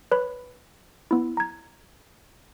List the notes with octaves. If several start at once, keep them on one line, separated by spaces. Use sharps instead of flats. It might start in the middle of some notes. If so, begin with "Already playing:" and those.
B4 C#5 B5
B3 E4
A#5 G#6